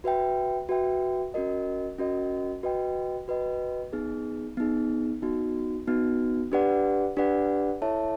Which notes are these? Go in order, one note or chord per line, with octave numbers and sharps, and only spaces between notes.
F#4 B4 E5 G5
F#4 B4 E5 G5
C#4 F#4 A#4 D#5
C#4 F#4 A#4 D#5
F#4 B4 D#5 G5
F#4 B4 D#5 G5
B3 D#4 G#4
B3 D#4 G#4
B3 D#4 F#4
B3 D#4 F#4
D4 G4 B4 D5 F#5
D4 G4 B4 D5 F#5
E4 A4 C#5 E5 A5